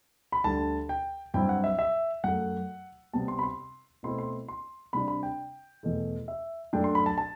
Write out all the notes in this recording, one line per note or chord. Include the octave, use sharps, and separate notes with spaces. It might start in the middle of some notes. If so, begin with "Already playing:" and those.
B5
D2 D3 G3 A5
G5
G2 F#3 C4 E4 G5
F#5
E5
E5
F#2 F#3 A3 F#5
C3 G3 B3 A5
C6
B5
C6
B2 A3 C4 E4 C6
C6
C6
C3 G3 D4 B5
B5
G5
E2 B2 A3
E5
F#2 F#3 A3 D4 G5
C6
B5
A5
A5